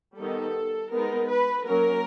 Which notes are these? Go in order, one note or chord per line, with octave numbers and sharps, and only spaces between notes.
D#3 G3 B3 D#4 A4
G#3 B3 D#4 A#4
B4
F#3 A#3 C#4 A#4